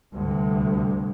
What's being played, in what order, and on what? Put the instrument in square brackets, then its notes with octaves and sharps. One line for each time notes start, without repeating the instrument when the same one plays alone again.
[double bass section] D2 G2 C3